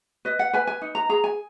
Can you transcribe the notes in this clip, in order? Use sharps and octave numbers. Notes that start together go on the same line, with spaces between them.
B4 D#5
F#5
B4 G#5
G#5
D#4
A#5
G#4 A#5
G#5